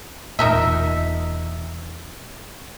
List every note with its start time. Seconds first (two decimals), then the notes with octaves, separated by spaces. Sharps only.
0.39 E1 A#2 D#4 A#4 E5